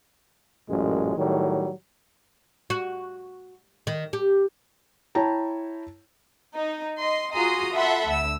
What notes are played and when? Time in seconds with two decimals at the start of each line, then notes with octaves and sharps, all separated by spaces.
0.68 A1 F#2 A#2 G#3
1.17 A2 D#3 F#3 G3
2.70 F#4
3.87 D#3
4.13 G4
5.15 E4 C#5 G5 A5 A#5
6.56 D#4
6.98 D#5 C6
7.33 F4 F#4 G#4 A#5 C6 D#6
7.73 F4 A4 E5 F#5 B5 C6
8.08 D2 E6